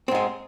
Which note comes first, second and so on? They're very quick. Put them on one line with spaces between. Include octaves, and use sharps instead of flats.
C4 G#2 G#3